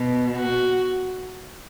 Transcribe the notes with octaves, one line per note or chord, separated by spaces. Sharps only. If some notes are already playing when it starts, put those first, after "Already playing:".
Already playing: B2
F#4